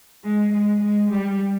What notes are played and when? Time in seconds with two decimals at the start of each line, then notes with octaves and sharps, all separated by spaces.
0.24 G#3
0.53 G#3
0.82 G#3
1.11 G3